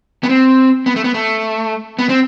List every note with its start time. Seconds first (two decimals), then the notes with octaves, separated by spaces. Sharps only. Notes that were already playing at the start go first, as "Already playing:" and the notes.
0.24 B3
0.29 C4
0.86 B3
0.96 A3
1.04 B3
1.14 A3
1.99 B3
2.09 C4